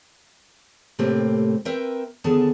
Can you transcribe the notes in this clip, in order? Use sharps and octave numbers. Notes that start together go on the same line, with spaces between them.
A2 C3 A3 A#3 C4 G4
C4 A#4 B4 E5 G5
D#2 D3 B3 G#4 A4 A5